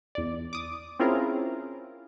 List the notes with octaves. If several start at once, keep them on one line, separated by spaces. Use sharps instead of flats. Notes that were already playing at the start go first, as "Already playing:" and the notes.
E2 D5
D6 D#6
C4 C#4 E4 F4 G#4 A#4